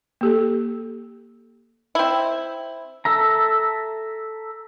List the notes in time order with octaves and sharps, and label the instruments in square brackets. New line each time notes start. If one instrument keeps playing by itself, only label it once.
[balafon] A#3 G4 A4
[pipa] C4 E4
[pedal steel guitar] A4 E5 A#5